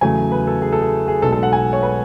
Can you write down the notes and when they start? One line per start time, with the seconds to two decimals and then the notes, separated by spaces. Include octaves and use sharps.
0.01 E2 C#3 F#3 A3 G#5
0.32 B4
0.47 A4
0.62 G#4
0.73 A4
0.82 G#4
1.08 G#4
1.22 B1 B2 G#3 A4
1.33 A4
1.43 F#5
1.53 G#5
1.73 C#5
1.83 B4